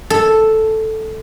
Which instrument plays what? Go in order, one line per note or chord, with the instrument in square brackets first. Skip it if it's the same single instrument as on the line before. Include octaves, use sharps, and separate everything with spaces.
[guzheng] A4